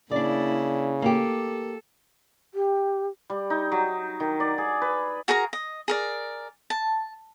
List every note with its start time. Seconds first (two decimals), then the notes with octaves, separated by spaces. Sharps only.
0.11 C#3 A#3 D4 E4 D5
1.02 A#3 G4 A4
2.54 G4
3.30 G3
3.50 D#4
3.72 F#3
4.20 D#3
4.40 D5
4.58 G#4
4.82 B4
5.28 F#4 G#4 A#4 A#5
5.53 D#5
5.88 G#4 A#4 D5
6.70 A5